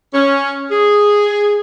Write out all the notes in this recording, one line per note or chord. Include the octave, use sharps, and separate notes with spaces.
C#4
G#4